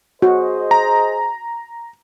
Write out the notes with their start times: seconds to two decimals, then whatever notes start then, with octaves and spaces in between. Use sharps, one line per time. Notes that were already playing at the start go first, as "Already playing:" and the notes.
0.22 F#4 G#4 C5 D#5
0.71 A#5